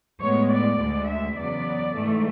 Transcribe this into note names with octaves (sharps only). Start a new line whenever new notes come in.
A2 G#3 B3 C#5
D5
D2 D3 G#3
E5
E2 C#3 F#3 B3 D5
G#2 E3 A3